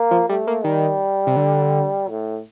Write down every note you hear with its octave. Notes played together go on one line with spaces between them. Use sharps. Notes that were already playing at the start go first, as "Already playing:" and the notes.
Already playing: A#3
F3
G3 A3
A#3
D#3 G3
C3
D3
A2